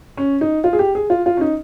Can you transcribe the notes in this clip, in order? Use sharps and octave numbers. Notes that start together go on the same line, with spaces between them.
C#4
D#4
F4
G#4
G4
G#4
F4
F4
C#4
D#4